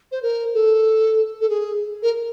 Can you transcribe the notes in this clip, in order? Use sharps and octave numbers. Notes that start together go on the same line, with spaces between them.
C5
A#4
A4
A4
G#4
A#4